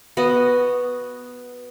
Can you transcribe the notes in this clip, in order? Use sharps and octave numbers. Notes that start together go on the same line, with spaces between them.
B3 F#4 D#5